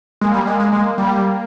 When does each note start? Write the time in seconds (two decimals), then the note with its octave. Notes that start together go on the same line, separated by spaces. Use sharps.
0.21 G#3 A#3
0.34 G3
0.47 G#3
0.60 G#3
0.73 G#3
0.98 G3